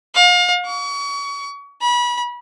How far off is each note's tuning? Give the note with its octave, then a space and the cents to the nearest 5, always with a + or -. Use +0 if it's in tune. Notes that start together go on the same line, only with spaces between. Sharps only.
F5 +35
C#6 +35
B5 -30